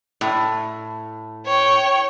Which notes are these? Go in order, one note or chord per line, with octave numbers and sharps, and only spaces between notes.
A2
C#5 G5